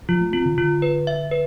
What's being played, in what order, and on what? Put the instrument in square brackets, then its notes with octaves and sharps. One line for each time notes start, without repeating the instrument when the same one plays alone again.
[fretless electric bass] F3 [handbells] F4
[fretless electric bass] A3
[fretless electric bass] C4 [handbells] F4
[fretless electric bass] D3
[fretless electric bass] D3 [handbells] F4
[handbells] B4
E5
B4